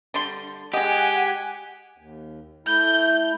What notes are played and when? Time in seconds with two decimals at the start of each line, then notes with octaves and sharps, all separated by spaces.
0.14 D3 G3 C6
0.74 G#3 G4 D#5 F#5 G#5
1.98 D#2
2.66 A3 E4 G6